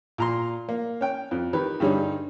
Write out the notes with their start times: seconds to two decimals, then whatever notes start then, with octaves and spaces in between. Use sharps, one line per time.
0.18 A#2 A#5 C6
0.69 A#3
1.01 C#4 G5
1.31 F2
1.53 D#3 G4 B4
1.80 G2 D3 G3 C#4 D#4